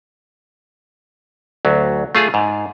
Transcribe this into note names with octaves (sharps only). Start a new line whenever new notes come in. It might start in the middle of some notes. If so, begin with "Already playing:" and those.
D2 F#3
A3 F4 G#4
G#2